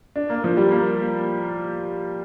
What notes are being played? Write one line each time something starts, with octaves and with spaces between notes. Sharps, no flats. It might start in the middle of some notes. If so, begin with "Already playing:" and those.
D4
A#3
F3
G3
A#3